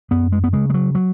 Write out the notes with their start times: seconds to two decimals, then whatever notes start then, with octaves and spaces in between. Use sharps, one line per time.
0.11 F#2 B3
0.32 G#3
0.44 B3
0.53 C#3 G#3
0.70 G#3
0.74 F#3
0.95 F#3